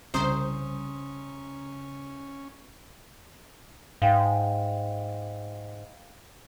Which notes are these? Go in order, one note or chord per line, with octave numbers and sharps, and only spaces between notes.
C2 C#3 C#4 C5 A#5 C6 D#6
G#2 F5 G5